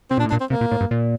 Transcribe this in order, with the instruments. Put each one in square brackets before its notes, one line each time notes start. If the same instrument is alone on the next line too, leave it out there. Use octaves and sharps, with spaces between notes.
[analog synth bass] C3 [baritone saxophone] C4
[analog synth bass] A#2 [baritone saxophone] D4
[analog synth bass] A2
[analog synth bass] A#2 [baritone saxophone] D4
[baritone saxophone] C4
[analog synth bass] C3 [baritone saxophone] A#3
[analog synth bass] A#2
A2
G2
A#2